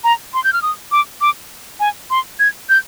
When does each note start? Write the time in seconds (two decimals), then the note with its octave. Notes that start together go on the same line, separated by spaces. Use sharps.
0.04 A#5
0.34 C6
0.44 G6
0.53 F6
0.62 D#6
0.92 D6
1.21 D6
1.80 G#5
2.10 C6
2.39 G#6
2.69 G6